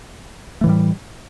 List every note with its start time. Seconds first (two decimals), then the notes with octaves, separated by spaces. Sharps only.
0.61 A3
0.64 E3
0.66 A2
0.69 G3